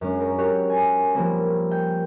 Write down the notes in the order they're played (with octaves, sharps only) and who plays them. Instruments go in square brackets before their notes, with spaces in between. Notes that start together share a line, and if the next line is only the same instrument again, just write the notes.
[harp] F#2 G#3 C#4 D4
A#4
F#4 G4 C#5 F#5
G#5
F3 G3 A#3 C4
G5